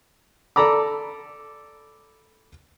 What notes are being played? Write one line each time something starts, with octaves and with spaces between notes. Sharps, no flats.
A4 D5 A#5 B5 D6